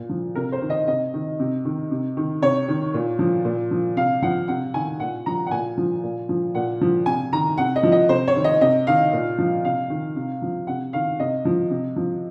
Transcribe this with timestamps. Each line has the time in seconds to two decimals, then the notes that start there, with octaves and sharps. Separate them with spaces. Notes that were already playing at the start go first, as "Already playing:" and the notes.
Already playing: A#2
0.09 F3
0.35 C3 A#4
0.52 C5
0.62 D#3
0.70 D#5
0.87 C3 D#5
1.14 D#3
1.40 C3
1.65 D#3
1.91 C3
2.17 D#3
2.42 C3 C#5
2.68 D#3
2.94 A#2
3.19 F3
3.45 A#2
3.71 F3
3.96 C3 F5
4.22 F3 F#5
4.48 C3 F#5
4.74 D#3 G#5
5.00 A#2 F#5
5.26 F3 A#5
5.47 F#5
5.51 A#2 G#5
5.78 F3
6.04 A#2
6.29 F3
6.55 A#2 F#5
6.81 F3
7.06 C3 G#5
7.33 D#3 A#5
7.58 C3 F#5
7.76 D#5
7.83 F3
7.92 D#5
8.09 C3 C5
8.28 C#5
8.36 D#3
8.44 D#5
8.61 C3 D#5
8.87 D#3 F5
9.13 A#2
9.38 F3
9.65 C3 F5
9.90 D#3
10.16 C3
10.42 F3
10.67 C3 F#5
10.93 D#3 F5
11.20 C3 D#5
11.45 F3
11.70 C3
11.96 F3